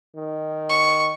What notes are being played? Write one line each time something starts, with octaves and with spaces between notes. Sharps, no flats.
D#3
C#6